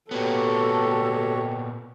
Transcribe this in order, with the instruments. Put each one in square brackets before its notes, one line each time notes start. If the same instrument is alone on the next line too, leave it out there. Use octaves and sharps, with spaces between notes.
[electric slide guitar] A#2 B3 [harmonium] F#4 G4 C#5 [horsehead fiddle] A4